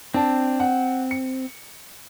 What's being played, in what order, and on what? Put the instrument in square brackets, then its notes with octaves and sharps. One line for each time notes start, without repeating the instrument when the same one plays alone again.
[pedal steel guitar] C4 [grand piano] D4 A5
[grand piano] F#5
C#7